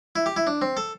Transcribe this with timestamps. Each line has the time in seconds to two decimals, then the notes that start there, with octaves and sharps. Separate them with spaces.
0.16 E4
0.26 G4
0.36 E4
0.47 D4
0.62 C4
0.77 A4